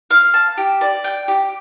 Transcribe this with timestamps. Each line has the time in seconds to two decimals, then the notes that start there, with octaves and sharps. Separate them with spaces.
0.11 F5
0.34 A5
0.58 G4
0.81 D5
1.04 G5
1.28 G4